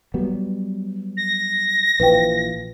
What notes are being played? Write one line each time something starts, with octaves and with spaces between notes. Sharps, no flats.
F#3 G3 B3
A#6
A#1 E3 F3 B4 G5